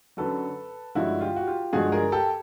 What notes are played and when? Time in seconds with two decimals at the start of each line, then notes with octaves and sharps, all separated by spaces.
0.17 F#2 D3 F#3 A4 B4
0.95 G2 D3 F3 G#3 E4 F#4
1.21 F4 G4
1.36 F#4
1.47 F4 G4
1.73 G2 D3 F3 G#3 F#4 G#4
1.92 G#4 A#4
2.12 G4 A4